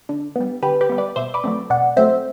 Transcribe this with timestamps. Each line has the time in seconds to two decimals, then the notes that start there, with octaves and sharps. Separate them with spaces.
0.09 D3
0.36 G3 B3
0.63 D3 G4 B4
0.81 G4 B4
0.90 G3 B3
0.98 B4 D5
1.16 B2 C5 E5
1.34 B4 D5
1.44 F#3 A3 C4
1.70 B2 D5 F#5
1.97 F#3 A3 C4 C5 E5